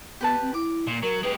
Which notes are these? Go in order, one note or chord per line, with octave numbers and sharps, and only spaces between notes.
B3 G4 B4 A5
C4
E4 D6
A#2
F#3 A#4
G#3 G4 B4